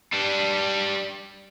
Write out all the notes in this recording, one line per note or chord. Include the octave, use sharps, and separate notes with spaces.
G3 D4